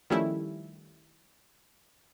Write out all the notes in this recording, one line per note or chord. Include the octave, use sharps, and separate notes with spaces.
D#3 F3 G3 A3 C#4 E4